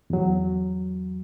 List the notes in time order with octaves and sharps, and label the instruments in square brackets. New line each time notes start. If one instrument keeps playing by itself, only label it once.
[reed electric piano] E2 F#3